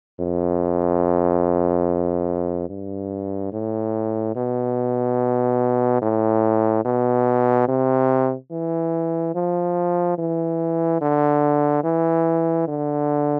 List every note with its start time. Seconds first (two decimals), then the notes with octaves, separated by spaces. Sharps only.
0.20 F2
2.69 G2
3.53 A2
4.36 B2
6.02 A2
6.85 B2
7.68 C3
8.52 E3
9.35 F3
10.18 E3
11.01 D3
11.84 E3
12.68 D3